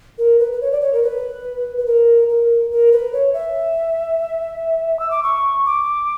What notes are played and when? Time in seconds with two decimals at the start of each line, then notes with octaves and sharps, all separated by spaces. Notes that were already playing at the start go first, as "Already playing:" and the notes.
0.18 A#4
0.39 B4
0.52 B4
0.61 C#5
0.72 D5
0.81 C#5
0.93 A#4
1.03 B4
1.78 B4
1.86 A#4
2.29 A#4
2.71 A#4
2.92 B4
3.13 C#5
3.34 E5
5.00 E6
5.11 D6
5.23 C#6
5.66 D6